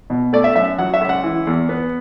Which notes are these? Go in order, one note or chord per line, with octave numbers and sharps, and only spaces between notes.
B2
A3 D5
E5
F#2 E5
F#3 F#5
E5
C#2
F#5
E3
E2
B3